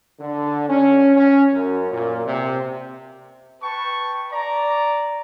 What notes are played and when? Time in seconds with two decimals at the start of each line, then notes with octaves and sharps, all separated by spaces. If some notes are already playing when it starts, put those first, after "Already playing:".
0.19 D3
0.69 C#4
1.17 C#4
1.54 F#2
1.91 A#2
2.25 C3
3.62 B4 G5 A5 C#6
4.31 D5 A#5